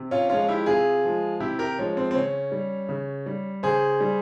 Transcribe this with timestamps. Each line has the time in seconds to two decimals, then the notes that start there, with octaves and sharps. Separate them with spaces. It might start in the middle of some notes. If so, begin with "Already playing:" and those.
Already playing: C3
0.11 C#4 F4
0.29 F3 G#3 C#4 F4
0.48 E4 G4
0.66 C3 F4 G#4
1.04 F3 G#3
1.40 C3 E4 G4
1.59 G4 A#4
1.79 F3 G#3 C#4
1.97 C4
2.11 C4
2.14 C#3 C#4
2.52 G3
2.89 C#3
3.26 G3
3.63 C#3 G#4 C5
4.01 G3